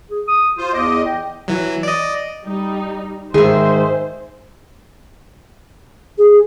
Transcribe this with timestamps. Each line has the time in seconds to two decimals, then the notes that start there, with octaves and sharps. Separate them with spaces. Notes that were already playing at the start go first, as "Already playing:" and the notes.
0.10 G#4
0.28 D#6
0.58 F4 F#4 C5
0.73 E2 D#5 D6
1.05 G5
1.48 E3 F#3
1.83 D5 D#5
2.44 G3 D#4
3.34 G#2 D#3 G#4 C5 E5
6.18 G#4